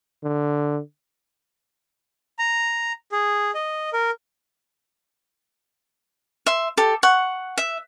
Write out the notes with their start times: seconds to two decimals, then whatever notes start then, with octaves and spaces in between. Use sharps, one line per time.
0.24 D3
2.39 A#5
3.12 G#4
3.55 D#5
3.93 A#4
6.46 E5 C6
6.77 G4 A4
7.03 F#5 C#6
7.58 E5